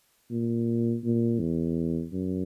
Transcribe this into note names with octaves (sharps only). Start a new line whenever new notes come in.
A#2
A#2
E2
F#2